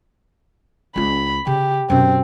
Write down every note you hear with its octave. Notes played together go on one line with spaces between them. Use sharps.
C#2 F4 B5
C#3 G4
F#2 B2 C4